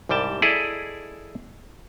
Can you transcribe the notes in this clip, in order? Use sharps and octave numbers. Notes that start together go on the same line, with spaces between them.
C2 G#2 G3 G5 A5
E4 G#4 A4 D5 D#5